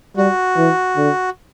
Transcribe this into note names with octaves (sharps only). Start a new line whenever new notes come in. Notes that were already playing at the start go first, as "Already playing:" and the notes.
G3 F#4
E3
D3